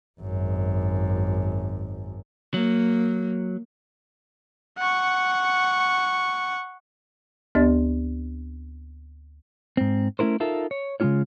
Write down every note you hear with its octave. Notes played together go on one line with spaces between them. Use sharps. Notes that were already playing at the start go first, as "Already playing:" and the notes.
G#1 F#2
F#3 A#3
F#5 C#6
D2 B3 D4 G4 D5 A6
G#2 C4
A3 C#4 E4 A#4 C5
D#4 F4 A4 A#4 E5
C#5
C#3 G#3 C#4 D4 F4 C#5